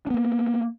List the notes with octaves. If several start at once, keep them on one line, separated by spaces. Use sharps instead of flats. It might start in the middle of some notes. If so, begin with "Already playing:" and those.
A#3 B3 D4